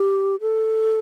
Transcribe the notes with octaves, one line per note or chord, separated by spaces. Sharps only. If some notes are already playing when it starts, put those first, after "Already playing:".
Already playing: G4
A4